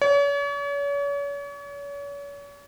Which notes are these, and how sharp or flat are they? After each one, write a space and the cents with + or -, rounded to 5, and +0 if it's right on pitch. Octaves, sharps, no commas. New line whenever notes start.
C#5 +40